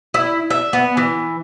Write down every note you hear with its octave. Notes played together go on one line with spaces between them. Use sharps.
E4
E5
B3
E3